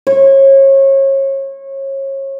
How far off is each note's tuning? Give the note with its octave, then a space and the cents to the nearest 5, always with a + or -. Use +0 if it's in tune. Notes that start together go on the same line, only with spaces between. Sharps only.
C#5 -30